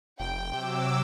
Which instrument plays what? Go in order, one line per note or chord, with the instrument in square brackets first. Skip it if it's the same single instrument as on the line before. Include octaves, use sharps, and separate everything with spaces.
[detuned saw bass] F1 [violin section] G5
[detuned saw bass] C3 [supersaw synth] F#3 D6 E6